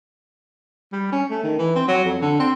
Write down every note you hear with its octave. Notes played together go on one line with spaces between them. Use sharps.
G3
C#4
A3
D#3
E3
C4
F#3
F2
D3
C4